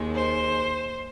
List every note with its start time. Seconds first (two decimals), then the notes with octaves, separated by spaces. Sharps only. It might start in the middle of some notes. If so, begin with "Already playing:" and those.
Already playing: D#2 D#3 G#3
0.15 C5